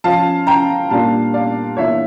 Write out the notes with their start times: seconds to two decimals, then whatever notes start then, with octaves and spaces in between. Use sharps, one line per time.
0.04 F3 C#4 F4 F5 A5
0.47 G5 A#5
0.90 A#2 G3 A#3 D4 F4 F5 A5
1.34 D5 F5
1.77 E3 A#3 D4 F4 C#5 E5